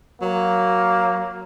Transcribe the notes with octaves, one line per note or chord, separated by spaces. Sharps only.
F#3 A#3